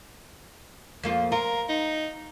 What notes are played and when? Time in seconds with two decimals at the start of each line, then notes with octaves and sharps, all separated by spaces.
1.04 F2 A#3 F4
1.32 F4 A#4
1.69 D#4